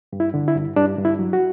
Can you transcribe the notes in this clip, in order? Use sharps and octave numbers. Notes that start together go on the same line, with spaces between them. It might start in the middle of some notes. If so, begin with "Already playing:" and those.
G2
E4
D3
E4
G2
G2 D4
G2
E4
F#3
F#4